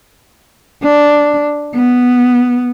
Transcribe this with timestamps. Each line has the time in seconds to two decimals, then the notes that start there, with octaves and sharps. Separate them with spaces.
0.83 D4
1.75 B3